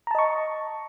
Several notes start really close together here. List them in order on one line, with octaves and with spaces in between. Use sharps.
A#5 A5 D#5 C#6